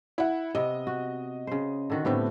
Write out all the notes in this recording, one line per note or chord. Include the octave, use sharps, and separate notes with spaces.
E4 F#5
C3 B3 D#5
F#4
C#3 C5
D3 D#3 F#4
A2 D3 A3 B3 C4 G4